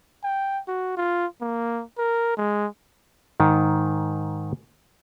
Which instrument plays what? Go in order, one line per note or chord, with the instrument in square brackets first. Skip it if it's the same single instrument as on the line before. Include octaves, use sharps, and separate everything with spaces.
[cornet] G5
F#4
F4
A#3
A#4
G#3
[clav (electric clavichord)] G#2 D#3